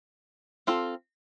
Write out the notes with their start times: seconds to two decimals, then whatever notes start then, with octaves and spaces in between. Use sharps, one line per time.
0.67 C4 F4 A4